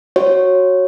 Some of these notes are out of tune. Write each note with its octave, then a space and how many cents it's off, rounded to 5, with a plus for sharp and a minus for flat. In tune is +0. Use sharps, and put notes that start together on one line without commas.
F#4 +0 C#5 -10